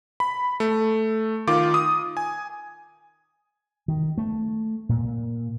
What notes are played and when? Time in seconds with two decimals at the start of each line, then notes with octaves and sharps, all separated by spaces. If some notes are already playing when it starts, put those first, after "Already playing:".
0.20 B5
0.60 A3
1.47 D#3 F4 D6
1.74 D#6
2.17 G#5
3.88 D#3
4.18 A3
4.89 A#2